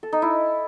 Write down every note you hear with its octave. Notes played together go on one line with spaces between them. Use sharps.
A4
D#4
E4